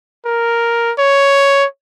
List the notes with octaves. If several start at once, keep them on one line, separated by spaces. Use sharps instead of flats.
A#4
C#5